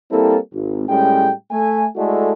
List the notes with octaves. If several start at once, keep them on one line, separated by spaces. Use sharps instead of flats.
G3 A#3 C4 E4 A4
G#1
A2 G3 G#3 C#4 G5
A3 G#5
G#3 A3 E4 F#4 A4 D5